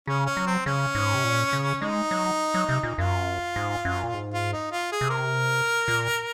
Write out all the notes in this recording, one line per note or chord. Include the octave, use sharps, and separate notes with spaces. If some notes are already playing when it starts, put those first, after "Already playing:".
C#3 C#4
C#4
F#3
C4
C#3 C#4
G#2
C3
A#2
C#3
G#3 D#4
F#3
F#3
C3
A#2
F#2 F4
G#2
F#2
A#2
G#2
F4
D#4
F4
G#4
C3
A#4
A#2